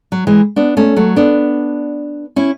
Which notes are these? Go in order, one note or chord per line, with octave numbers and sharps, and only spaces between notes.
F#3
E3 G#3
B3 D4
A3 C#4
F#3 A3
B3 D4
C#4 E4